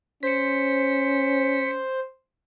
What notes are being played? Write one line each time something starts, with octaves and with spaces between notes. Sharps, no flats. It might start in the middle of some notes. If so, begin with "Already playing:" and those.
C#4 C5 B6 C#7